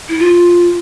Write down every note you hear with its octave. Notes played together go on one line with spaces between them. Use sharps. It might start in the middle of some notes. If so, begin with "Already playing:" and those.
E4
F4